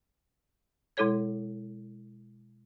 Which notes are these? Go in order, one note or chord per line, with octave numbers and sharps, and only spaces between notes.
B2 G#3 E4 A4 C#5 G#6